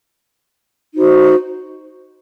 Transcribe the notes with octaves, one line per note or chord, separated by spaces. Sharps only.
D#4 F#4 C5